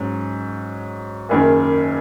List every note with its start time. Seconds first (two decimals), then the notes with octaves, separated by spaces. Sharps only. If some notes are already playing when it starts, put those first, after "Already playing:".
Already playing: G#2 F#3 C#4
1.29 F#1 F#2 D#3